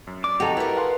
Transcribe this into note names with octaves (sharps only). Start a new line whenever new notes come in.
F#2
D5 D6
D#3 C4 F#4 G4 A4 D#5 A#5
E4 A#4 B4 G5
F5 F#5 C6